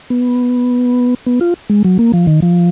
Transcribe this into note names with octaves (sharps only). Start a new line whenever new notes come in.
B3
B3
F4
G#3
F#3
A#3
F3
D#3
F3